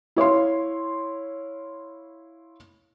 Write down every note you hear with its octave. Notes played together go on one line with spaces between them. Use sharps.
E4 C#5 F5 C6